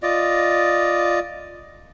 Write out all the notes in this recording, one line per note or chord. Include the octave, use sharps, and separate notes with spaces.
F4 D5 D#5